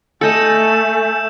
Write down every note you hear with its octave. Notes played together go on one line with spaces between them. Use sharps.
A3 A4 D#5 G#5 E6 G6 E7